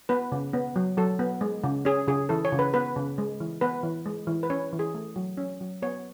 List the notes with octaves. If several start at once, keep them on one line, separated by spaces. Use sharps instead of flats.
B3 B4
C#3
B3
F#3
F#3 A4
B3
G#3
C#3
C#4 G#4
C#3 G#4
E3 A4
C#5
C#3
B4
B3 B4
C#3
G#3
E3
B3 B4
E3
G#3
E3
B4
C#4 C#5
E3
G#4
A3
F#3
C#4
F#3
B3 C#5